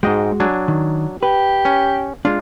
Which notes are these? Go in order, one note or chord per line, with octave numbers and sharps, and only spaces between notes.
G#2 G#3 F#4 D#5 G5
F#3 D4 G#5
D#3
G4 B4
C#4
G#3 D4 F4